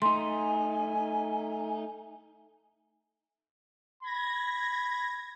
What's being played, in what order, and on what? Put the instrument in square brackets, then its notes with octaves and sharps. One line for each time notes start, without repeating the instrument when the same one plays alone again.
[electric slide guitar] A3 D#4 [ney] G#5 [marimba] C6
[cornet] B5 [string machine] G#6 A#6